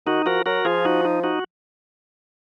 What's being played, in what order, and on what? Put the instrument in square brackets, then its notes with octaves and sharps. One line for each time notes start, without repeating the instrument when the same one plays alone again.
[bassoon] D#3 [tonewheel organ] D#4 F#4
[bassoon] F3 [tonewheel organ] F#4 A#4
[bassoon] F#3 [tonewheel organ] F#4 A#4
[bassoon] F3 [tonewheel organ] F4 G#4
[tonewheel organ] D#4 F#4
D#4
D#4 F#4